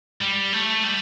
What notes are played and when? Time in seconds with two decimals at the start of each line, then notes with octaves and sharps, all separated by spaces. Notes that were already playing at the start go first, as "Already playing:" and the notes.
0.21 G3
0.53 A3
0.84 G3